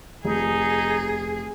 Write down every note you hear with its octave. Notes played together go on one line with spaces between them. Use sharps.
F1 D#4 G#4